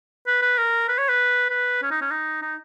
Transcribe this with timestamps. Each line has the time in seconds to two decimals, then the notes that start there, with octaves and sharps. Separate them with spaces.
0.27 B4
0.42 B4
0.58 A#4
0.88 B4
0.98 C#5
1.09 B4
1.50 B4
1.83 C#4
1.91 D#4
2.01 C#4
2.11 D#4
2.42 D#4